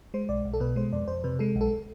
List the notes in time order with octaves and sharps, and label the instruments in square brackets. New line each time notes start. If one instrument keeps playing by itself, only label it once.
[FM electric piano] G#3 C5
B1 D5
B1
A4
B2 B4
G#3 C5
F2 D5
F2 C5
C3 B4
G#3 A4
B1
A4